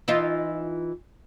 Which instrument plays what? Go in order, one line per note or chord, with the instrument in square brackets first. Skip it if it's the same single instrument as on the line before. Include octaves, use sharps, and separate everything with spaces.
[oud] E3 D#4 F4